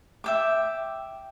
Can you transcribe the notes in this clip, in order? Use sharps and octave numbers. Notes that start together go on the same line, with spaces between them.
E5 G5 D6